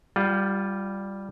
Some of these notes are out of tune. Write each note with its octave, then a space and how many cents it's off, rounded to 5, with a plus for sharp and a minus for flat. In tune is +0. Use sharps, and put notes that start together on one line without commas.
G3 +0 F4 +0 F#5 +40